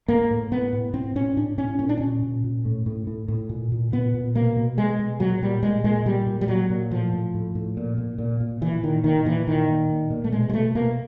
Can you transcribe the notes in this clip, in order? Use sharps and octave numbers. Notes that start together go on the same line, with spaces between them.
A2 A#3
A2
A2 B3
A2
A2 C4
A2 C#4
A2 D4
A2 C#4
A#2 C#4
D4
A#2 C#4
A#2
A#2
A2
A2
A2
A2
A#2
A#2
A#2 B3
A#2
B2 A#3
B2
B2 G#3
B2
A#2 F#3
A#2 G3
A#2 G#3
A#2 G#3
A#2 G3
A#2
G3
A#2 F#3
A#2
A2 F3
A2
A2
A2
A#2
A#2
A#2
A#2
A#2 E3
A#2 D#3
A#2 D#3
A#2 E3
A#2 D#3
A#2
A#2
A#2
A3
B2 G#3
G#3
B2 A3
B2 A#3